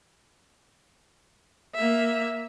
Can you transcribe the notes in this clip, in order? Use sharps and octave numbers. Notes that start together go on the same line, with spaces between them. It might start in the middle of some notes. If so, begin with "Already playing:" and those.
A#3 E5